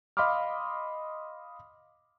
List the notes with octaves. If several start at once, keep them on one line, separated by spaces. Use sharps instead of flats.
D#5 F5 B5 C6 D6 F6